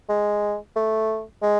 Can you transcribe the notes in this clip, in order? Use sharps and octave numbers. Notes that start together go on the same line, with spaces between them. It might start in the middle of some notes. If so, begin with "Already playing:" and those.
G#3
A3
G#3